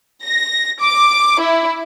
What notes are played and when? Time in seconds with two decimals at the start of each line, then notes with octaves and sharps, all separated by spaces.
0.24 A#6
0.80 D6
1.41 E4